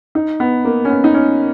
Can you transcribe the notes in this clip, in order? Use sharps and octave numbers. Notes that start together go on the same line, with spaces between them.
D#4
B3
A#3
C#4
B3
D#4
C#4